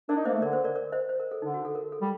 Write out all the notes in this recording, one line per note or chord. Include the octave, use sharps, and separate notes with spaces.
D4 A#4 D5
D#4
A#3 C5 D#5
A3
D3 A#4 D5
C5
A#4 D5
A#4 D5
C5 D#5
C5
A#4
A4
D3 D#4
F#4
A4
A#4
A4
G3